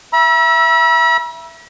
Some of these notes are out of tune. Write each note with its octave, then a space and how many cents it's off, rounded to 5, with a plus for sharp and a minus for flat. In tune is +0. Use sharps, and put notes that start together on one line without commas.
E5 +15 B5 -45 E6 +0